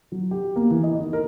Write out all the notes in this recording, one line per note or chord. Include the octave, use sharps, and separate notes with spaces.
F#3
G4
A#3
E3
D#5
D#3
A#4